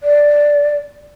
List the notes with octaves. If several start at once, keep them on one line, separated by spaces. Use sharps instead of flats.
D5